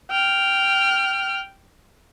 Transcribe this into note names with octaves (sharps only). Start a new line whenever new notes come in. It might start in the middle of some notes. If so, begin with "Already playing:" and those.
G5 F6